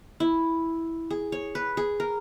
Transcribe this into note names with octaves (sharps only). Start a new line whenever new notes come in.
E4
G#4
C#5
B4
G#4
A#4